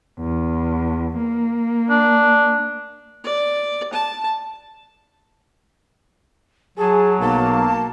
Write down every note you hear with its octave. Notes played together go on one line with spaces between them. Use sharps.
E2
A#3
D4
D5
A5
F#3 G#4 A5
B1 A#3 A5